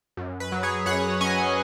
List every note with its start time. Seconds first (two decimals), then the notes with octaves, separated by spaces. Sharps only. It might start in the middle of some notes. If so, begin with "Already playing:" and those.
0.17 F#2
0.40 B4
0.52 F#3
0.63 G#4 C#5
0.86 F#2 C#5 F#5
1.21 C#4 D#5 G#5